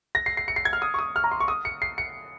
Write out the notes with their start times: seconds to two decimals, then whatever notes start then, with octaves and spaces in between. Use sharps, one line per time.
0.15 A#6
0.26 C7
0.37 C7
0.48 C#7
0.56 C7
0.65 G#6
0.73 F6
0.82 D#6
0.94 C#6
0.99 D#6
1.16 F6
1.24 A#5
1.31 C6
1.40 C#6
1.48 D#6
1.65 C#7
1.82 C7
1.98 C#7